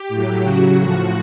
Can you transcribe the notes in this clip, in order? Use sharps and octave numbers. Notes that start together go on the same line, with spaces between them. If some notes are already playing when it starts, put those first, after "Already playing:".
Already playing: G4
A2 F#3
C#3 F#3 F#4
A2 F3